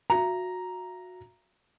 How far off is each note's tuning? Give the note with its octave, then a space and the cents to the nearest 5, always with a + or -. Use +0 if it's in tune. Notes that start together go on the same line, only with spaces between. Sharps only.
F#4 -20 E5 +45 A#5 +0